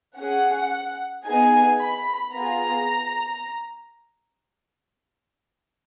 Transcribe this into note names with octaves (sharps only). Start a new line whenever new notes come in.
C#4 G#4 F#5
B3 D#4 G#4 G#5
B5
B3 F4 G#4 A#5